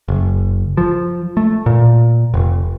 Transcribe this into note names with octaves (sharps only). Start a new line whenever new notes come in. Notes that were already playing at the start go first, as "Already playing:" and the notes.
F#1
F3
A3
A#2
F1